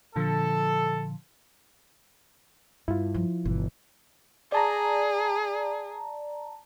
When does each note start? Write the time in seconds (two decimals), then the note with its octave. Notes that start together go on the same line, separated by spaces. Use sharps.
0.16 A#2 D3 F3 A4
2.88 G2 B3 E4 F4
3.14 F3
3.45 G1 B2 E3
4.52 G#4 D5 A5 A#5